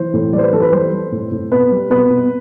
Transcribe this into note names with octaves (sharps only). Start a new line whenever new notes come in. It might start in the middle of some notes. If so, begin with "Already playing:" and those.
Already playing: E3 C5
A2
G3 D5
C5
B4
E3 A4
B4
G3 C5
G3
A2
A2
B2 B4
G3
B2 B4
B2